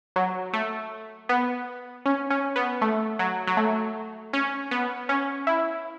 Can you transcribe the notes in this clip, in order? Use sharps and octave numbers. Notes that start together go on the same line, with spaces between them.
F#3
A3
B3
C#4
C#4
B3
A3
F#3
F#3
A3
C#4
B3
C#4
E4